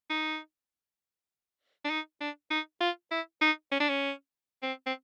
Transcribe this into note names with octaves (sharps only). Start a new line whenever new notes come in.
D#4
D4
D#4
D4
D#4
F4
E4
D#4
C#4
D4
C#4
C4
C4